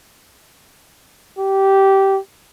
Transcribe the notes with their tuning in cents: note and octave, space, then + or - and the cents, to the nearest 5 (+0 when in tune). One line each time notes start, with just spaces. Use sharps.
G4 -15